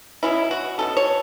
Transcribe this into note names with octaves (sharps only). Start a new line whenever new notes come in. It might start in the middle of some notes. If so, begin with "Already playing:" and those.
B2 F#3 C#4 E4
F#4
B2 F#3 C#4 A4
C#5